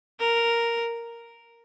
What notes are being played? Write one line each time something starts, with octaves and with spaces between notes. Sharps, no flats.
A#4